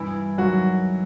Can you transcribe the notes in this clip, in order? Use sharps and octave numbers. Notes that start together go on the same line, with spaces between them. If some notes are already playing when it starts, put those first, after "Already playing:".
Already playing: G2 E3 E4
D#3 F#3 F#4